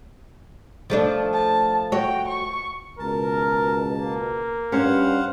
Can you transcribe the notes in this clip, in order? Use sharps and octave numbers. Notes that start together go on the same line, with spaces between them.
F3 A3 D4
A5
F#4 C#5 G5
C#6
C#2 B2 A#4 A5
A#3
G2 C#4 C5 F5 F#5